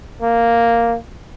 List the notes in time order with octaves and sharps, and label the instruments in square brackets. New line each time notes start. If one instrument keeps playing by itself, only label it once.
[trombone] A#3